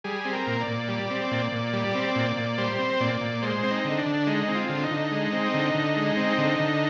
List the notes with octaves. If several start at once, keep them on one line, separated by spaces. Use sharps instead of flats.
G3 G#4
C4
A#4
A#2
D5
A#2
G3
C4
A#2
A#2
G3
C4
A#2
A#2
G3 C5
C4
A#2 D5
A#2
G#3 C5
C4
D#4
D3
D4
D3
G#3 D#4
C4
F4
D3
D#4
D3
G#3
C4
D3
D3
G#3
C4
D3
D3